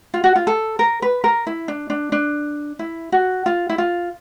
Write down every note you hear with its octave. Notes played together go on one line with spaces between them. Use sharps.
F4
F#4
F4
A4
A#4
B4
A#4
E4
D4
D4
D4
E4
F#4
F4
E4
F4